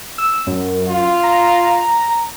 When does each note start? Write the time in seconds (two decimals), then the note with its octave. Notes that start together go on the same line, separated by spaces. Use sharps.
0.18 E6
0.47 F#2
0.88 F4
1.23 A#5